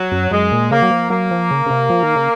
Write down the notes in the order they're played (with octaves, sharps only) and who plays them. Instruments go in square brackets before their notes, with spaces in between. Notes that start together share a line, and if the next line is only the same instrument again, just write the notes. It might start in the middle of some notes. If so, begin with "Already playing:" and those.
Already playing: [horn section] F#3
[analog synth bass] F#2
[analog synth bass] F#2 [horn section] G#3
[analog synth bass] A#2
[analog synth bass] C#3 [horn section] A#3
[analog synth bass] F#3
F3
[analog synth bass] F#3 [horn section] A#3
[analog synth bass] F3
C#3
C#3
C3
F3
D#3
C#3